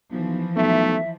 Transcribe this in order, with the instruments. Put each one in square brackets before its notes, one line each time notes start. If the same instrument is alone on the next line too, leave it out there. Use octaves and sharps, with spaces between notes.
[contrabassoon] B1 [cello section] E3 F3
[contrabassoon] B1 [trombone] A3 [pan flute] E5